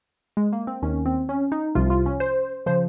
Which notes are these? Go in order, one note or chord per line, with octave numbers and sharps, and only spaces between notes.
G#3
A#3
C4
D#2 D#3 C#4
C4
C#4
D#4
C2 C3 F3 F4
F4
C#4
C5
C#3 F3 C5